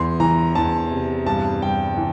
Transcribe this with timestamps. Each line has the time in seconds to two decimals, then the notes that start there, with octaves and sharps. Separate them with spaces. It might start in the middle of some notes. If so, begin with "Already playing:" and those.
Already playing: E2 C6
0.20 E3 A#5
0.55 E2 A5
0.91 C3
1.26 G2 A5
1.62 G2 G5
1.97 E3